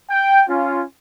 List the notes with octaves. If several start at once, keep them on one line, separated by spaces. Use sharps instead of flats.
G5
C#4 F4